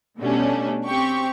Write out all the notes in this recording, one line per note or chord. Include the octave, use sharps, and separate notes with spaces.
B2 G3 A3 C#4 D4
C4 G4 C#6